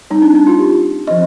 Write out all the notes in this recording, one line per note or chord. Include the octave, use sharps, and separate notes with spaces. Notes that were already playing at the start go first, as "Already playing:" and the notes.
G3 C4 D#4
D4
D4
F4
G4
F3 C4 D#5